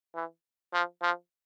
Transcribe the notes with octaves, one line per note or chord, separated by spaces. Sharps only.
E3
F3
F3